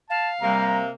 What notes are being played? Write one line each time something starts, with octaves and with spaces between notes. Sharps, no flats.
F5 A5
C3 G3 A#3 A#5